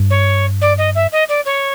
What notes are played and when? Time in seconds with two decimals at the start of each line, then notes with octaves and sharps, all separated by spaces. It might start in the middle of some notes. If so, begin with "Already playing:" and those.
Already playing: G2
0.10 C#5
0.61 D5
0.78 D#5
0.95 E5
1.12 D#5
1.28 D5
1.45 C#5